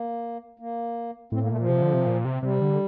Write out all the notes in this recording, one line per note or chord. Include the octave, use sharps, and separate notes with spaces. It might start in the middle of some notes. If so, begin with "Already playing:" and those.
Already playing: A#3
A#3
A2 C4
A#3
A#2 A3
F3
C3
D3
C3
A#2
C3
C3 G3
D3